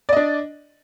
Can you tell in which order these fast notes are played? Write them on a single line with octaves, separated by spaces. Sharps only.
D5 D#5 D4